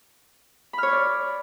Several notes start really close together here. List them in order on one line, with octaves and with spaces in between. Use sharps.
B5 F6 C#5 C#6 D5